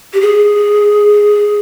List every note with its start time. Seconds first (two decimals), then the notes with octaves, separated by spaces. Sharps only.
0.13 G4
0.21 G#4